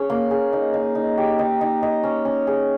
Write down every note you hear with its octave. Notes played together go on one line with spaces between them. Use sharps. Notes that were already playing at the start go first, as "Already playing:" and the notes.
Already playing: C#4 G#4
A#3
G#4
D#4
D#4
D#4
G4
D#4
D#4
D#5
C#4
C#4
G#4